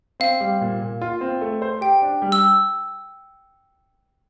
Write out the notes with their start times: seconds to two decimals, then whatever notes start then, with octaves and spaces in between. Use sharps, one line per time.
0.20 C4 F5
0.40 G3
0.61 A#2
0.81 A#2
1.01 F4
1.21 C4
1.41 A3
1.62 C5
1.81 G4 G5
2.02 D4
2.22 G3
2.32 E6